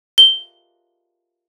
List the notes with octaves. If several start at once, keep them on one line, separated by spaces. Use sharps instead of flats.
G7